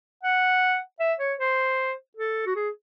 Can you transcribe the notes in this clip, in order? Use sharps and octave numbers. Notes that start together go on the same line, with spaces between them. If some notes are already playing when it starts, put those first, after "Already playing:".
F#5
E5
C#5
C5
A4
F#4
G#4